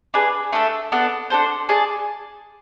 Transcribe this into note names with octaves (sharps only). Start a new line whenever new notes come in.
D4 G#4 B4
A3 D4 A4 E5
B3 D4 A4 D5
D4 A4 C5
G#4 D5 A5